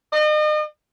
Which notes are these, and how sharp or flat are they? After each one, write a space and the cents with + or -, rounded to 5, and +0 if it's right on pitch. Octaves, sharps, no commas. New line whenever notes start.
D#5 -40